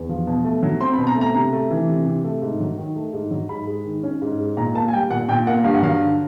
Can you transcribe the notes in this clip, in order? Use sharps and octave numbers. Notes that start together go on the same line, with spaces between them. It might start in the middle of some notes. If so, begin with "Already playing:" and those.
Already playing: E2
F3
B2
A3
F#3
C4 C6
B5
B2
A#5
A3
A#5
C3 A#5
A3
E3
C3
C3
A3
G#2
F#3
D#3
A3
G#2
F#3
G#2 B5
G#3
D#3
C#4
G#2
G#3
A#2 A#5
A#3 A5
G#5
G3 G5
A#2 F#5
A#2 G5
A#3 F#5
G2 F5
F#5
F#3 F5
D3